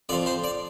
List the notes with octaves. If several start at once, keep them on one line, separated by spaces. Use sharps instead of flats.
F2 F3 D5
C5
D5